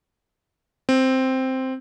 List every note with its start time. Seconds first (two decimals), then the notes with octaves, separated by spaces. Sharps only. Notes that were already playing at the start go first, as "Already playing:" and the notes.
0.89 C4